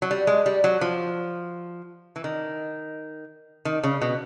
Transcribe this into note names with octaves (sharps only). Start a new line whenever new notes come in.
F#3
G3
G#3
G3
F#3
F3
E3
D#3
D#3
C#3
B2